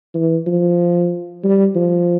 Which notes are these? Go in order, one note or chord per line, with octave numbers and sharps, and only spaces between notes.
E3
F3
G3
F3